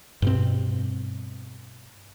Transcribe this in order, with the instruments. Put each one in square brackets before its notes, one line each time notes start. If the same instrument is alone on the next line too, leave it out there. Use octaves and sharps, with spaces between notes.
[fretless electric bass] G2 B2 C4